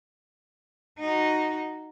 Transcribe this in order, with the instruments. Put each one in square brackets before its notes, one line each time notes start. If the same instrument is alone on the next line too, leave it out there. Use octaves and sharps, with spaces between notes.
[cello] D#4 F#4